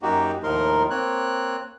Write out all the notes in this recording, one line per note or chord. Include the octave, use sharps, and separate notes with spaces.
F#2 A#3 D#4 F#4 G4
D#2 A2 F3 D#4 A#4 C6
A#3 C4 C#5 F#6